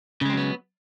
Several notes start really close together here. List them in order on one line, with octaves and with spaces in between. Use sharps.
C#3 G#3 C4 F#3 B3